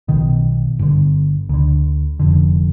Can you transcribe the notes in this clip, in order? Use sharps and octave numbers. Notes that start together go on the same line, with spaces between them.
B1 B2 D#3
G1 G2 D3
D2 D3
F1 F2 D3